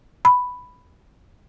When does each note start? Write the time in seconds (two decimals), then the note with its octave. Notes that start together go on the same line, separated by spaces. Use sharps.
0.25 B5